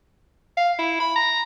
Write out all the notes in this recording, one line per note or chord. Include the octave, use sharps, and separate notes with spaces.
F5
E4
B5
A#5